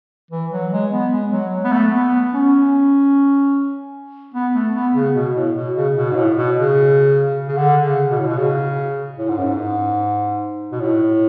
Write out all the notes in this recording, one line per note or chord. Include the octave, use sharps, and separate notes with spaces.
E3
F#3
G#3
B3
G#3
F#3
B3
A3
B3
C#4
B3
A3
B3
C#3
B2
A2
B2
C#3
B2
G#2
A2
B2
C#3
C#3
D3
C#3
B2
A2
B2
C#3
A2
G#2
F#2
G#2
B2
A2